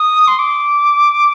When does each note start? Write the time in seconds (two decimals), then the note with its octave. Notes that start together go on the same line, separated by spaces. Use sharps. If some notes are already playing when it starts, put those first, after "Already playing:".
Already playing: D#6
0.27 C6
0.39 D6